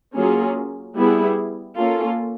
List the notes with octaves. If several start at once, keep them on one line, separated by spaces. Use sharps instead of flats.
F#3 A#3 C#4 F4 G#4
G3 B3 E4 G#4
A#3 C#4 F4 A4